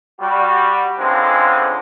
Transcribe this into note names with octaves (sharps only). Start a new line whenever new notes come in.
G3 F#4
C#2 G#2 D3 F3 G#3 C4